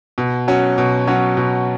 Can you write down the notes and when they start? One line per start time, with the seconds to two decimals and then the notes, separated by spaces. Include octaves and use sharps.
0.18 B2
0.48 F#3 C#4 F#4
0.78 B2
1.07 F#3 C#4 F#4
1.37 B2